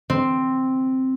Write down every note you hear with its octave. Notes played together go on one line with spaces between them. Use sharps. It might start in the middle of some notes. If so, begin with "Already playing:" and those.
C4